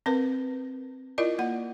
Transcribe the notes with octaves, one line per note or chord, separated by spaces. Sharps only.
C4 A#4 B4
E4 F4 A#4 D5 D#5
A#3 F#5